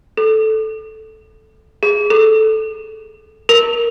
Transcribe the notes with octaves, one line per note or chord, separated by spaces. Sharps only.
A4
G#4
A4
A#4